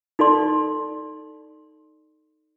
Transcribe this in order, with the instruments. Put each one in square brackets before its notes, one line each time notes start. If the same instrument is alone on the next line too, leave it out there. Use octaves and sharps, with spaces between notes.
[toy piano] D#4 A4 D5 C6